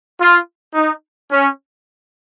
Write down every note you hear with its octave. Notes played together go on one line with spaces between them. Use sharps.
F4
D#4
C#4